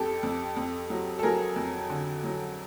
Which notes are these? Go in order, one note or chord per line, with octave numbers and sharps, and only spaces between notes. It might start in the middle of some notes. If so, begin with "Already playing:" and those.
Already playing: F2 G4 A4
F2
F2
F#3
A4
F#3 G#4 A#4
F2
D3
F#3